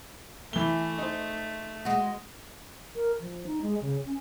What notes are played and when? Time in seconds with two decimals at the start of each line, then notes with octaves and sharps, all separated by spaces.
0.53 E3 A3 G7
0.98 D#4 C5
1.85 G#3 F#4
2.95 A#4
3.21 F3
3.47 D#4
3.62 G#3
3.81 C#3
4.06 C#4